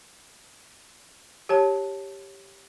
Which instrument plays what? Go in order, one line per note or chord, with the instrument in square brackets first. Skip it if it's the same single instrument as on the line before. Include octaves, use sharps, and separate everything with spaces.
[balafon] G4 C#5 A5